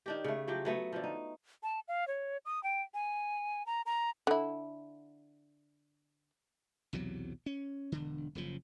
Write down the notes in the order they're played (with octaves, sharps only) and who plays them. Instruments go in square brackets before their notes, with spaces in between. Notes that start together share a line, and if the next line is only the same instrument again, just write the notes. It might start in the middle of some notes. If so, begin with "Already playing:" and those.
[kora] D#3 D4 G4
C#3 A3
F3 F#3 G4 G5
F#3 A3 B3
D3 F3
D#4
[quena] A5
F5
C#5
D#6
G5
G#5
A#5
A#5
[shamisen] D3 E4
[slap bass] B1 E2 C3 F#3
C#4
E1 D3
F#1 C#3 F3